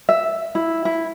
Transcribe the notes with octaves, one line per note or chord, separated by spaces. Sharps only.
E5
E4
E4